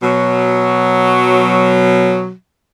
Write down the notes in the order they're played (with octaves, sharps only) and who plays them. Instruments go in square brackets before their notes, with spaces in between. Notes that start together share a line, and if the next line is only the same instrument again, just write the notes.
[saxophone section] B2 F#3